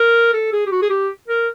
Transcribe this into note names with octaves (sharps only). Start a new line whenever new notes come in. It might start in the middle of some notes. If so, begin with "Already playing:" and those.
Already playing: A#4
A4
G#4
G4
F#4
G#4
G4
A#4